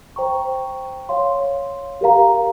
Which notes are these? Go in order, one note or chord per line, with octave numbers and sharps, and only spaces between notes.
C5 G5 A#5 C#6
C#5 F5 C6
G4 A#4 F5 A#5